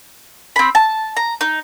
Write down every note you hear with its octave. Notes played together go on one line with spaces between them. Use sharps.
C4 B5
A5
A#5
D#4